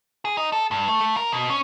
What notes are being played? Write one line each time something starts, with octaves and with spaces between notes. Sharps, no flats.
G#4
D#4
A4
G2
A3
A3
A#4
B2
C#4